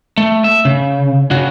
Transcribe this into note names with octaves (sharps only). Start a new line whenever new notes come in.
A3
E5
C#3
C#3 F#4